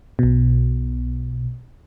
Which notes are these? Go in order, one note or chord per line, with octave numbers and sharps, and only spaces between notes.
B1 B2